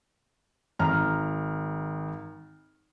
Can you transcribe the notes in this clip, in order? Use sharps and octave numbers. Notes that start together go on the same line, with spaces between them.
G#1 A#5 F6